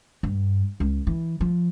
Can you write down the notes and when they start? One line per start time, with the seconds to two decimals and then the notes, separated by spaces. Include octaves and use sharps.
0.23 G2
0.80 C#2
1.07 E3
1.41 F3